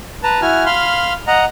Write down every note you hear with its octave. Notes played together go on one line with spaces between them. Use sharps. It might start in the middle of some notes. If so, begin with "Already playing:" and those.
B4 A5 A#5
E4 F#4 G#5 F6
F5 B5 C6 F6
D#5 F#5 A#5